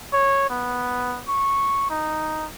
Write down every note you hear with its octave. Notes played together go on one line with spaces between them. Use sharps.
C#5
B3
C#6
D#4